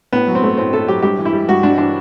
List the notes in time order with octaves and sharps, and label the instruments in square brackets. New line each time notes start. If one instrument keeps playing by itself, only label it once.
[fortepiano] A2 B3
F#3
C4
A3
A2 C4
A2 A4
F#3 G4
G2 G4
E3
E4
G3
G2 F#4
G2 D4
E3 D4